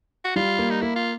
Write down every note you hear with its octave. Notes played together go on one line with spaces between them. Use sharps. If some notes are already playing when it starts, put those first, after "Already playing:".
F#4
G3 F4
A#3
D#4
A#3 E4
F4